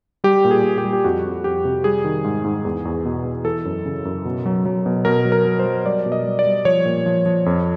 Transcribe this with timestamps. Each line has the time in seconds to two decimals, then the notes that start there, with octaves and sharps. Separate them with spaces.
0.24 G3 G4
0.45 A#2
0.51 G#4
0.64 A#2
0.78 G4
0.84 G3
0.93 G4
1.04 F2 F#4
1.25 F2
1.44 F2 G4
1.65 C3
1.84 G3 G#4
2.04 D#3
2.24 G#2
2.45 G#2
2.65 E2
2.85 E2
3.05 B2
3.25 E2
3.45 E3 A4
3.65 F#2
3.85 C#3
4.05 F#2
4.25 B2
4.46 F#3
4.65 F#3
4.86 B2
5.05 B2 A#4
5.25 F#3
5.32 A#4
5.45 F#3
5.59 C5
5.66 F#3
5.85 G3 D5
6.06 B2
6.12 D#5
6.26 G3
6.39 D5
6.46 G3
6.65 F3 C#5
6.85 A#2
7.06 F3
7.26 F3
7.46 F2